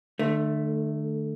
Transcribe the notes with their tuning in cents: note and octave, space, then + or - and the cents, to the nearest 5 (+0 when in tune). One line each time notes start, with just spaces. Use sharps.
D3 +40 A3 +0